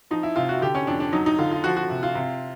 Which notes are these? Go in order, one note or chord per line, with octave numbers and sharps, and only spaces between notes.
F3 D#4
E4
C3 F4
F#4
D3 G4
C#4
F2 D4
D4
F#3 D#4
D#4
D3 F4
F4
F3 F#4
F#4
C3
F4
C3